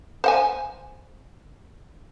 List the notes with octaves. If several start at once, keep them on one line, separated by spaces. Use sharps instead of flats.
C5 F#5 G#5